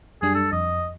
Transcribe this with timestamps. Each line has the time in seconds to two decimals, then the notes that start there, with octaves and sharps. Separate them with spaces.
0.22 F#2 G3 D4 G#4
0.35 A4
0.52 F2 D#5